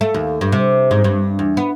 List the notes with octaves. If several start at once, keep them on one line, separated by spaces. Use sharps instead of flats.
A3
D#2
G2
C3
G#2
G2
E2
B3